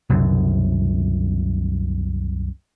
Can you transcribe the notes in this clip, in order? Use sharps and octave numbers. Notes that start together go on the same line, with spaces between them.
C2 F#2 B2 D3